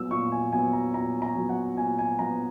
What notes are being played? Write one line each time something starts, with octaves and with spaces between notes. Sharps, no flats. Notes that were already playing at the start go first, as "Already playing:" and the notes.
Already playing: A#2 F#3 B3 E6
A#2 C#6
G#5
F#3 B3 G#5
A#5
A#2 A#5
A#5
F#3 B3
F#5
A#2 G#5
G#5
F#3 B3 A#5